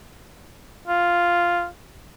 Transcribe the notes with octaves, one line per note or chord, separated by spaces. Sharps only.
F4